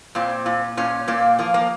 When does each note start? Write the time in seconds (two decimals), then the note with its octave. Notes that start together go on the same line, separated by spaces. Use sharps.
0.15 A#2 C4
0.46 A#2
0.77 A#2 C#4
1.08 A#2 A#3
1.39 F3 A#3
1.54 A#3